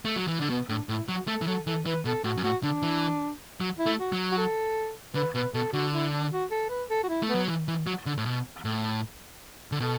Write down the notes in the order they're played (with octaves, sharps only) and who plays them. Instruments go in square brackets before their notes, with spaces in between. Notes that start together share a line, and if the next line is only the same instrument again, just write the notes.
[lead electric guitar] A3
F#3
E3
[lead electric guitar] D3 [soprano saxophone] D4
[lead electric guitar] B2 [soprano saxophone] B3
[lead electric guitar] A2 [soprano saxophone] D4
[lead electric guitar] A2 [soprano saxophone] E4
[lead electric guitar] F#3 [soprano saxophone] F#4
[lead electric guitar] A3 [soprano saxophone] A4
[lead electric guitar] E3
[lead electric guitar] F#3 [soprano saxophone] A4
[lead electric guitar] E3 [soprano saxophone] A4
[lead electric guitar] E3 [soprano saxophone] B4
[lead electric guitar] B2 [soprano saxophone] A4
[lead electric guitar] A2 [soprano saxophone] F#4
[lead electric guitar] F#2
[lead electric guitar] A2 [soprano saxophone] F#4
[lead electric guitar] D3 [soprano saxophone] D4
[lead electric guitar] E3
F#3
[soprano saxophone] E4
[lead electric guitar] A3
[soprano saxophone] F#4
[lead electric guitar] F#3
[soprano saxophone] F#4
A4
[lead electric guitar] D3 [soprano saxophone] B4
[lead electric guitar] B2 [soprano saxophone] B4
[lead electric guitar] B2 [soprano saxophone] A4
[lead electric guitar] D3 [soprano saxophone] F#4
[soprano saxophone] E4
D4
F#4
A4
B4
A4
F#4
E4
[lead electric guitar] A3
[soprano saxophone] B3
[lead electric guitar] F#3
E3
E3
F#3
D3
A2
B2
A2
D3
[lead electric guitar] B2 [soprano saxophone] A4